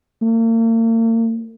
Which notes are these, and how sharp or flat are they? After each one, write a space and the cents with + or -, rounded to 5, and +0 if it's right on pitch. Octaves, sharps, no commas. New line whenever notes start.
A#3 -40